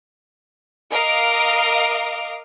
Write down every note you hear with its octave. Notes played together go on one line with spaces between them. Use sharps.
A#4 D#5 F5 D6